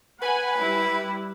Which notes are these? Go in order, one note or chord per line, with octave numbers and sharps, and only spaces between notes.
B4 F#5 G#5 B5
G3 E4